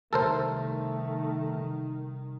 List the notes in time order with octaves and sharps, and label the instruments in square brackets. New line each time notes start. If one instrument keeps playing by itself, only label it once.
[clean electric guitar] C2 [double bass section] D#3 [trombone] A3 [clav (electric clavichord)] A4 A#4 C5